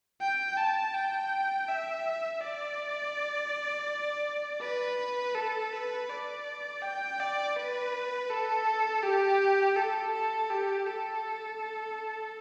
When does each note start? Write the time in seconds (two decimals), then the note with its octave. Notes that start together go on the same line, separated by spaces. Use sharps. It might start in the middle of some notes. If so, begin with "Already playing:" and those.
0.21 G5
0.57 A5
0.94 G5
1.68 E5
2.41 D5
4.61 B4
5.35 A4
5.73 B4
6.10 D5
6.82 G5
7.20 D5
7.56 B4
8.30 A4
9.03 G4
9.76 A4
10.14 A4
10.50 G4
10.87 A4